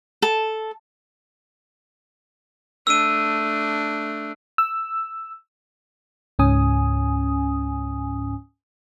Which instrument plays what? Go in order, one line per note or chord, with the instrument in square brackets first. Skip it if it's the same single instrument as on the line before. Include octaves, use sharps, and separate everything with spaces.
[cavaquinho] A4
[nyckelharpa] A3 D4 [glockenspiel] E6 D#7
[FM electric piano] E6
C#2 G#2 C#4 G#5 D#6